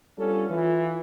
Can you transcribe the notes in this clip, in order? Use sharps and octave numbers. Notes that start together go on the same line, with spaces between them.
G3 B3 C#4 D4 F4 A4
E3 F4